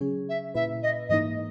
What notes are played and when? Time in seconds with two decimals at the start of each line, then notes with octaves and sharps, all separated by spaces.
0.01 C#3 F#3 C#4 G#4
0.29 E5
0.55 A#2 A#3 E4 B4 E5
0.82 D#5
1.09 G#2 E3 A#3 D#4 D#5